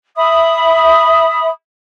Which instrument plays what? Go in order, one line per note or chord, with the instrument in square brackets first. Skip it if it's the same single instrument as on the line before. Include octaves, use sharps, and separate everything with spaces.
[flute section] E5 B5 D#6